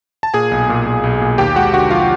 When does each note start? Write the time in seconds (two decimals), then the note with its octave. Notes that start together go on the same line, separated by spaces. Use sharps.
0.23 A5
0.34 A#2 G#4 G#5
0.51 B1
0.69 A#2
0.86 A#2
1.04 B1
1.21 A#2
1.38 D#2 G4 G5
1.56 G#3 F#4 F#5
1.73 D3 F#4 F#5
1.91 F3 F4 F5